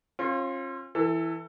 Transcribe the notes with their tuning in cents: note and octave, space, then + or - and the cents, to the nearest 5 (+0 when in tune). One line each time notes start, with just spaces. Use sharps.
C#4 -40 F4 +5
E3 +0 A4 +25